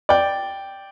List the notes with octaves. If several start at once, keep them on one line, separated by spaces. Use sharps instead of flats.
D5 G5